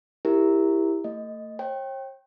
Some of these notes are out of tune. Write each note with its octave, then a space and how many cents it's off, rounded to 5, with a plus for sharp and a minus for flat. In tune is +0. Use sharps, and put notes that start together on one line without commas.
E4 +0 G4 +15 A#4 +0
A3 +35 D#5 +0
C#5 -45 G5 +0